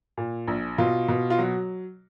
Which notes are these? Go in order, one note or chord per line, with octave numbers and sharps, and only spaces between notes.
A#2
A#1
B2 F4
B2
F4
F#3 F#4